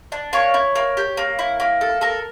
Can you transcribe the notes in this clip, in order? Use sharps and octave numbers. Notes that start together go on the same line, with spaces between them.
D4
A#3 C#5
E4
A#3
G4
A#3
E4
A#3
A4
A4 A#4